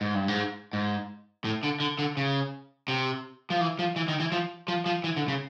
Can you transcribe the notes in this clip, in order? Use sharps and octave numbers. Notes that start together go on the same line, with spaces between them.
G#2
G2
G#2
G#2
A2
D3
D3
D3
C#3
C3
F3
E3
F3
E3
D#3
E3
F3
F3
F3
E3
D3
C#3